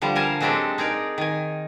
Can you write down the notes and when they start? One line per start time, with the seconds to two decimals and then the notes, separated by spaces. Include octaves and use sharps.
0.02 D3 F3 G3
0.15 A#4 F5 G#5 A5
0.41 F#3 G#3 C4 D4 G4 A4
0.78 D#4 G#4 A#4 D5
1.18 D#3 G#5